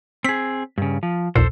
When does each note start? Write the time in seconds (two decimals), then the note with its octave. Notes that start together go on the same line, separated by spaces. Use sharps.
0.24 C4 G#4 B6
0.78 G2 C#3
1.03 F3
1.36 A#1 D#2 A#2 A4 C5